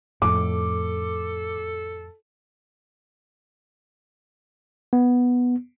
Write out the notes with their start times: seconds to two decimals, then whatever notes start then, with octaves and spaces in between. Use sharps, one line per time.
0.22 F2 A2 A4 D6
4.93 B3